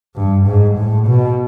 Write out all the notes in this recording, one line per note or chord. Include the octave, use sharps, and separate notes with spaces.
G2
G#2
A2
B2